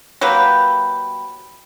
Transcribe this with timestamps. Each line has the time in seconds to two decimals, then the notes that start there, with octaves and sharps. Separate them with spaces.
0.21 F#3 A#3 G4 B4